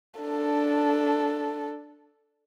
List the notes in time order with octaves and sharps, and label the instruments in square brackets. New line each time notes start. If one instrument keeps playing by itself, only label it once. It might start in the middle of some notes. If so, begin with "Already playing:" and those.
[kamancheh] D4 A4